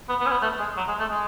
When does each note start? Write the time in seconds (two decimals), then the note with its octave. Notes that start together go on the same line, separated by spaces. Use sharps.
0.09 B3
0.21 B3
0.26 C#4
0.31 B3
0.42 A3
0.59 G#3
0.77 F#3
0.88 G#3
0.99 A3
1.10 G#3